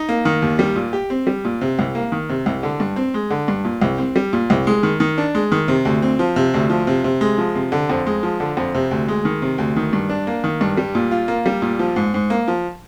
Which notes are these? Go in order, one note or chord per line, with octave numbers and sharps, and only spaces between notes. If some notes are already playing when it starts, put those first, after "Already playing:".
Already playing: D#4
A#3
D#3
D#2
G3
A#2
G4
C4
G3
A#2
C3
C2
A#3
D#3
C3
C2
D3
G2
C4
G#3
D3
G2
A#2
C2
C4
G3
A#2
C2
G#3
D#3
D#3
D4
G#3
D#3
C3
D2
C4
F3
C3
D2
F3
C3
C3
G#3
F3
C3
D3
F2
G#3
F3
D3
F2
C3
D2
G#3
D#3
C3
D2
D#3
G2
D4
A#3
D#3
G2
G3
A#2
F4
A#3
G3
A#2
F3
G#2
G#2
A#3
F3